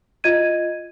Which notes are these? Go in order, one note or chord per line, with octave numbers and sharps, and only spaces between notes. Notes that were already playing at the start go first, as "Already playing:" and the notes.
F4 D#5 G#6 D#7